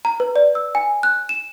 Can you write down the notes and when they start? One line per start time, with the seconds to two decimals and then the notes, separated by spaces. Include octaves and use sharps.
0.05 A#5
0.20 B4
0.36 D5
0.55 E6
0.75 G#5
1.03 F#6
1.29 E7